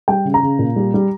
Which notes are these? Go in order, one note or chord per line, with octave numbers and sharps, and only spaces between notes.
G3 G5
C#3
A#5
C#3
A#2
G3
G3